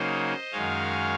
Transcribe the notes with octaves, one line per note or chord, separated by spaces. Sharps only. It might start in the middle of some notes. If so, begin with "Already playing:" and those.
Already playing: C#3 F#3 A#3 D#4 C5 D#5
F#2 D#3 G#3 C#5 F5